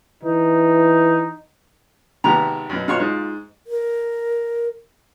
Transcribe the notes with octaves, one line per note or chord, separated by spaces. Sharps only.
E3 D#4
G#1 C3 B3 A#5
F#2 B2
B2 F4 C#5 F5 C#6
G#2
A#4